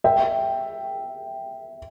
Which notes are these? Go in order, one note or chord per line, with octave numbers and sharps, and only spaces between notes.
E5 G5